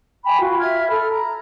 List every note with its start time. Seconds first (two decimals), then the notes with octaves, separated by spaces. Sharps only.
0.23 G5 G#5 B5
0.41 F4 F#4
0.60 E5 F6 G#6
0.88 A4 B5 F6
1.10 A#5